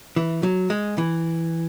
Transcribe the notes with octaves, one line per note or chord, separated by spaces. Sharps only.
E3
F#3
G#3
E3